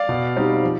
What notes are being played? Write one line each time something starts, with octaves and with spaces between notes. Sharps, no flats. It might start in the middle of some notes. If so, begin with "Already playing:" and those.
Already playing: D5 F5
B2
G3 C4 D#4
F3